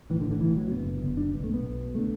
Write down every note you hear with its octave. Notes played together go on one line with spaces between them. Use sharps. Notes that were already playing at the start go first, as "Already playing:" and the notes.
A1 A2 E3
D3
D3
A1 A2 E3
F#3
F#1 F#2 D3 B3
F#1 F#2 D3
D4
B1 B2 B3
A3
B3
B1 B2
D3 A3